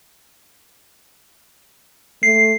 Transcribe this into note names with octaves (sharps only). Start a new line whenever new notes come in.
A3 C7